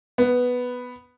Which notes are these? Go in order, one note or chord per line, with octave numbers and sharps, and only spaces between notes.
B3